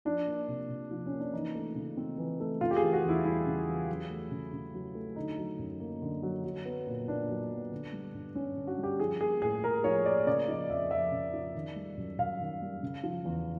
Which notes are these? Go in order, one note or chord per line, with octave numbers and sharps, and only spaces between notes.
F3 D4
A#3
C3
C3
F3
C#4
A#3
D4
E3 D#4
A3
C#3
C4
E3
A3
C#3 F4
G4
G#4
E3
F#4
E2 E4
G3 E4
C#3
E3
F#3
A3
C#3
C#3
F#3
A3
D3 D#4
F#3
F#2
A#3
D3
F#3
F#3
B3
A#2
A#2 D4
F#3
B3
D3
G3
G2
G2 C#4
D3
F#4
G3
G4
F3 G#4
A#3 G#4
A2 G#4
A2 A#4
F3 C#5
A#3 D5
C#3 D5
F3 D#5
F2 E5
F2 E5
C#3
F3
D#3
G3
F#2
F#2 F5
D#3
G3
C#3
F3
E2